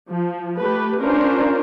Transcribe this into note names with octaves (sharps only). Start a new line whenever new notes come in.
F3
A3 G4 B4
C#4 D4 F4 A#4 C5